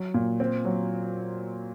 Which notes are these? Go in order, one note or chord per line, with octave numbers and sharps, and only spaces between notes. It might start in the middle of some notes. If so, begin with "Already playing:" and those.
Already playing: F#3
A#2
C4
F#3